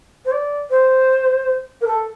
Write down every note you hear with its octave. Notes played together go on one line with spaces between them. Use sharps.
C5
D5
C5
A#4
A4